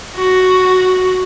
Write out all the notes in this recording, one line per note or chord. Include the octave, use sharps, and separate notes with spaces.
F#4